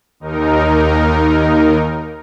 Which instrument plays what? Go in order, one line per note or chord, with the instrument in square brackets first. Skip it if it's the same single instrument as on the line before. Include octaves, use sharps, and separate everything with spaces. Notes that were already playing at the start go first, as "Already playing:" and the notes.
[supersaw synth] D#2 D#4 A#4